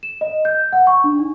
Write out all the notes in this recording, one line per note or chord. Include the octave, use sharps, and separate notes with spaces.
E7
D#5
G6
F#5
C#6
D4
D#4